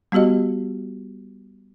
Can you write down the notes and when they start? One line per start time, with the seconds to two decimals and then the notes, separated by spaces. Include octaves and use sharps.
0.12 G3 B3 F#4 G4 D#5